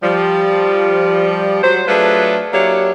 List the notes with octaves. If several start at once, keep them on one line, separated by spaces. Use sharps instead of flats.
F3 G3
F#3 C5
F#3 A3 D4 F4 G#4 B4
F#3 A#3 D4 E4 G4 C#5